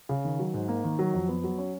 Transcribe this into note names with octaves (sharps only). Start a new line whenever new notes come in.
C#3
D#3
F#3
G#2
A#3
D#3
F#3
F2
B3
F#3
C#4